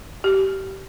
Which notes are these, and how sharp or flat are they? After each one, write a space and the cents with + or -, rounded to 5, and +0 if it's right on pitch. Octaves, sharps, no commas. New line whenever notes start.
G4 -25